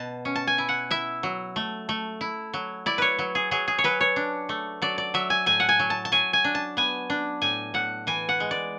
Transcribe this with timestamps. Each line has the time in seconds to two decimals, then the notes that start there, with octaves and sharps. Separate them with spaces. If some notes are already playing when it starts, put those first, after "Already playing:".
Already playing: B2 A5
0.25 C#4
0.36 A5
0.47 G#5
0.58 E4
0.69 F#5
0.91 E4 E5
1.23 F#3
1.56 A3
1.89 A3
2.21 E4
2.54 F#3
2.86 E4 D5
2.98 B4 C#5
3.19 F#3
3.35 G#4
3.51 F#3 G#4
3.68 G#4
3.78 C#5
3.84 F#3 B4
4.01 C#5
4.16 D4
4.49 A3
4.82 F#3 D5
4.98 D5
5.14 F#3 E5
5.30 G#5
5.46 A2 G#5
5.60 F#5
5.69 G#5
5.79 F#3
5.90 A5
6.05 A5
6.12 F#3 G#5
6.33 G#5
6.44 D4
6.55 A5
6.77 B3 G#5
7.10 D4
7.42 A2 G#5
7.74 A2 F#5
8.07 E3 G#5
8.29 F#5
8.40 G#3
8.51 D5